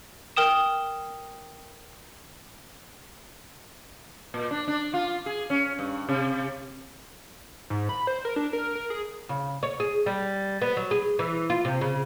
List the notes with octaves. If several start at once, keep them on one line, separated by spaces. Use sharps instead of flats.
A#4 G5 D#6 E7
A#2
D4
D4
F4
G#4
C#4
G2
C3
G#2
B5
C5
A#4
D4
A#4
A#4
G#4
C#3
C#5
G#4
G3
B3
F#3
G#4
E3
F4
C3
C#3